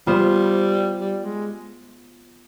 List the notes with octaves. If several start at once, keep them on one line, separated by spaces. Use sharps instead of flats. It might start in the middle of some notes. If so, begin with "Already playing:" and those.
G3 B3 F4 C5
G3
G#3